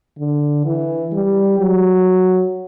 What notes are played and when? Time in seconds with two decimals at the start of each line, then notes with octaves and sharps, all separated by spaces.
0.19 D3
0.65 E3
1.13 G3
1.59 F#3